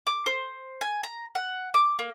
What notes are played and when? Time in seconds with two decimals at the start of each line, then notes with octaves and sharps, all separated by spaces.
0.07 D6
0.26 C5
0.81 G#5
1.03 A#5
1.35 F#5
1.74 D6
1.99 A#3